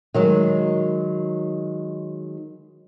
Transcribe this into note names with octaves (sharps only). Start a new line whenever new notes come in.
D#3 F#3 G#3